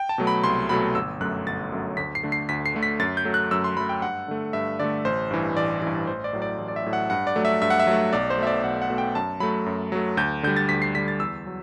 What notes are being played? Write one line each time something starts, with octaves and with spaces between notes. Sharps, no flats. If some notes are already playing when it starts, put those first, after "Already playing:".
Already playing: G5
A5
B2 F#3 A3
B5
C2 C6
B2 F#3 A3 B5
G1 E6
F#2 F#3 A3 F#6
G1 A6
F#2 F#3 A3
D2 B6
C7
D3 A3
C7
D2 B6
C7
D3 A3
B6
F#2 A6
G6
F#3 A3
F#6
F#2 E6
C6
F#3 A3 B5
G5
G2 F#5
D3 A3
G2 E5
D3 A3 D5
A1 C5
G2 E3
A1 D5
G2 E3
A1 C5
D5
A2 F#3
D5
A1
D5
E5
A2 F#3
F#5
G2 F#5
D5
F#3 A3
E5
G2 E5
F#5
E5
F#3 A3
B1 D5
C5
B2 A3 E5
D5
B1 F#5
F#5
B2 A3
G5
F#2 A5
F#3 A3 B5
F#2
F#3 A3
D2 G6
D3 G3 G6
A6
D2 B6
C7
D3 G3 B6
A6
E2 E6
F#3